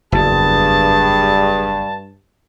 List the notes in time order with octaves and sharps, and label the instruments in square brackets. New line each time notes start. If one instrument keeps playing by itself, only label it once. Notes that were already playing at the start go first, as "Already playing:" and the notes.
[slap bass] F#1 E2 [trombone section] G2 [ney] G#4 [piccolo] A5